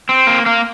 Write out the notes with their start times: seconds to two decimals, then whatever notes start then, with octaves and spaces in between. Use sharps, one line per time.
0.09 C4
0.27 A#3
0.46 A#3